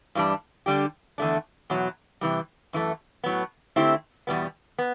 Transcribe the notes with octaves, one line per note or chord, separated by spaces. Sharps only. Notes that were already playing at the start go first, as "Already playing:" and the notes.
G2 E3 G3 D4
D3 G3 D4 G4
E2 D3 A3 D4
E2 B2 F#3
C3 E3 G3
F#2 E3 A3
A2 F#3 B3
D3 A3 C4 E4 G4
E2 B2 G3 B3
B3